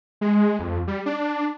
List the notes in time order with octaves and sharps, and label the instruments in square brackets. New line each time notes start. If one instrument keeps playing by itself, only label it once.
[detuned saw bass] G#3
F2
G3
D4